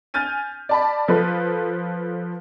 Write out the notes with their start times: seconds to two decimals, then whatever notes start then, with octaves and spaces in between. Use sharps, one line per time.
0.14 G#5 F6 G6 A6 D#7
0.69 D5 A5 B5
1.08 F3 A4 B4